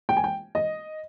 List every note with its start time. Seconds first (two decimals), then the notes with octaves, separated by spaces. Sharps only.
0.09 G5
0.17 G#5
0.24 G5
0.55 D#5